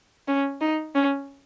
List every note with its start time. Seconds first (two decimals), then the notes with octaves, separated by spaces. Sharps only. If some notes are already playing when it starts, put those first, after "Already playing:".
0.28 C#4
0.61 D#4
0.95 C#4